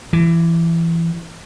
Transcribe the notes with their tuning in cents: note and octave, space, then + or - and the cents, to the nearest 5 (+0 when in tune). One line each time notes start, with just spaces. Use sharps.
E3 +20